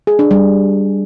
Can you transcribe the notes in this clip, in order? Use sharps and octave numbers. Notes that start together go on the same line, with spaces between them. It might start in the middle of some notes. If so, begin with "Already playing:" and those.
G#4
D4
G3